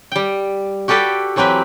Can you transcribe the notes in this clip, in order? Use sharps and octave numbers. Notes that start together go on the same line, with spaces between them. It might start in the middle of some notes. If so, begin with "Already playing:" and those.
G3 G5
F#4 G4 A4 B4 D5 G5
E3 F#3 C4 G4 B4